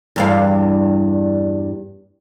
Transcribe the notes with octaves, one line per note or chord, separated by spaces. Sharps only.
E2 G2 F5